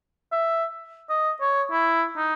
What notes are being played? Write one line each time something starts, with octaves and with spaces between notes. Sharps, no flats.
E5
D#5
C#5
E4
D#4